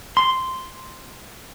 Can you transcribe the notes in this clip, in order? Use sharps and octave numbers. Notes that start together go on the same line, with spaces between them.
C6